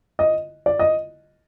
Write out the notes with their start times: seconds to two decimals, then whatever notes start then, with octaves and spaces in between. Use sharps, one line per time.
0.19 D#5
0.66 D5
0.79 D#5